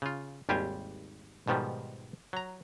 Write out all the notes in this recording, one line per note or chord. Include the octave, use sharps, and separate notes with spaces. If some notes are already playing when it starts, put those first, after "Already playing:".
C#3 F4
G#1 D#2 G3 G4 C5 G#5
G#2 B2 D#3 F3 G3
F#3 A#5